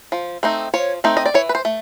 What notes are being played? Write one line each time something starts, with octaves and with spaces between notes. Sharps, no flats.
F3
A3 C4 D#4
F3 C#5
A3 C4 D#4
D#5
D5
E3 C#5
B4
C5
A3